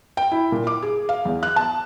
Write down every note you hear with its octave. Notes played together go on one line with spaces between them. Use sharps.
G5
E4
A#2
D6
G#4
F5
E2
F#6
A5